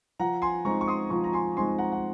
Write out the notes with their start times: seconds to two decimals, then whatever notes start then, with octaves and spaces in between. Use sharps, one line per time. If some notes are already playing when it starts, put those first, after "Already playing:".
0.20 F3 F#5 A#5
0.42 G#5 C6
0.65 G#3 C4 D#4 A#5 C#6
0.81 C#6
0.88 C6 D#6
1.10 F3 A#5 C#6
1.24 A#5
1.33 G#5 C6
1.57 G#3 C4 D#4 G#5 C6
1.78 F#5 A#5
1.92 F#5